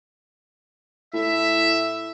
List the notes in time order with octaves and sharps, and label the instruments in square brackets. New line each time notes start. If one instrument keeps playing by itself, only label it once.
[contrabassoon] A2 [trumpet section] E5